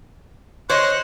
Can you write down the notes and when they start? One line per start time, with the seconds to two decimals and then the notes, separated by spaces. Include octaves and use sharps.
0.70 C5 C#5 D#5 C6 C#6 F#6